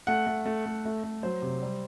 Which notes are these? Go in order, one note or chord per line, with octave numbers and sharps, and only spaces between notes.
A3 F#5
A3
A3
A3
A3
A3
F#3 C5
C3
G3